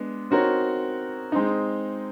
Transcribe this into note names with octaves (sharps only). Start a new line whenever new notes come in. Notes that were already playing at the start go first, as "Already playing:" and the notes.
Already playing: G#3 B3 D4
C4 D#4 F#4 A#4 C#5
G#3 C4 D#4